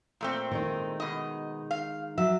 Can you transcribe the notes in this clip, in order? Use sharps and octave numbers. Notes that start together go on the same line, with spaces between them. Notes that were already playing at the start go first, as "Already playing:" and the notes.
A#2 A3 C4
D#3 G#3 D#4
B2 D#5
F5
F#3 E5